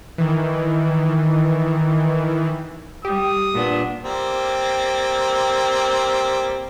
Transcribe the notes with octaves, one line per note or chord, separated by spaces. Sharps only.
D#3 E3
G3 G4 D#6
A#2 B3 D4
G3 A#3 C4